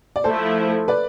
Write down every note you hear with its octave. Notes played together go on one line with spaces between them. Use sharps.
D5
F3 A3 E4 A4 C5
B4 D5